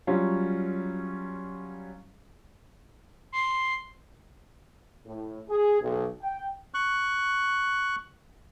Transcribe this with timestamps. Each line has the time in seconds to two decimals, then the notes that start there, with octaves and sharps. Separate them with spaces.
0.07 F#3 G3 C#4 F4
3.32 C6
5.06 A2
5.49 G#4
5.81 B1
6.21 G5
6.74 C#6 F#6